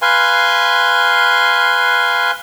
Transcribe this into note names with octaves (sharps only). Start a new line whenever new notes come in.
B4 F5 G#5 C6